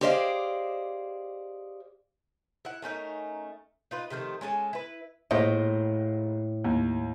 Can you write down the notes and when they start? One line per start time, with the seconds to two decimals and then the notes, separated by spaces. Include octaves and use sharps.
0.01 G4 G#4 C5 D5 D#5 F5
2.65 E4 F#5
2.82 A3 C#4 D#4 A#4
3.91 D#4 F4 B4
4.10 C3 D#3 F3 A3
4.41 G#3 C#4 A4 G#5
4.73 E4 B4
5.31 A#1 A2 C5 D#5
6.64 D#2